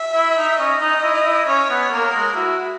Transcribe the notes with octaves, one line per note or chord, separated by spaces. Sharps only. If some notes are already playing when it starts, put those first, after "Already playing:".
Already playing: E5
E4
D#4
C#4 D#5
D#4
E4
E4
C#4 C#5
B3
A#3 A#4
G#3
E4 F#4